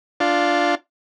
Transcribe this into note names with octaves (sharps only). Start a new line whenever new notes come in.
D4 F4